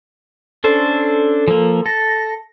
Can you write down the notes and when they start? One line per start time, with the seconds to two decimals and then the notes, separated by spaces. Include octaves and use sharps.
0.64 C#4 D4 A4 C5
1.48 F3 A#3
1.86 A4 A#6